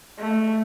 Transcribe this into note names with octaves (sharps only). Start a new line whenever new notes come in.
A3